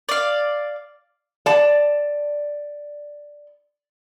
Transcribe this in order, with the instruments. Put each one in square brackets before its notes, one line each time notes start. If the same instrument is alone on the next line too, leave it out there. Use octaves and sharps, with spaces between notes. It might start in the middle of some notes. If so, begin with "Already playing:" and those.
[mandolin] D5 F5
[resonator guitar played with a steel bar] D5 A5